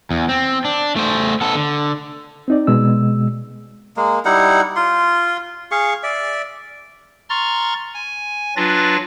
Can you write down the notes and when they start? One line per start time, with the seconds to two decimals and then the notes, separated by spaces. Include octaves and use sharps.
0.11 E2
0.29 C4
0.65 D4
0.96 A3 C5
1.41 B3 A4
1.55 D3
2.48 C4 D#4 D5
2.67 B2 G#3 E6
3.96 G#3 A#3
4.25 G3 D#4 E4 F#5
4.76 F4 C6
5.71 G#4 F5 C#6
6.03 D5 E5
7.30 A#5 C6 C#6 F6 A6
7.94 G#5
8.56 F#3 D4 F4 B4 A6 A#6